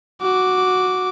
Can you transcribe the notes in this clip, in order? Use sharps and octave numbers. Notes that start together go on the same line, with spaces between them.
F#4 D6